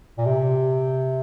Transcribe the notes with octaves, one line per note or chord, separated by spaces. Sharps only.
A#2
C3